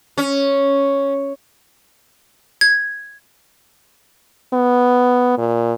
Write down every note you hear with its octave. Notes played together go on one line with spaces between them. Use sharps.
C#4
G#6
B3
A#2